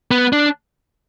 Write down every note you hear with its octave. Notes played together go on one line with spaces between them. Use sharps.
B3
D4